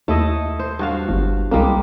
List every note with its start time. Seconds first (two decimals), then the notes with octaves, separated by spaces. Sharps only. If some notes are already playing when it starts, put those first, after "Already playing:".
0.08 D#2 A3 E4 D#5
0.59 C5
0.79 G2 F#4 F5
1.09 G1
1.51 C2 G3 G#3 A#3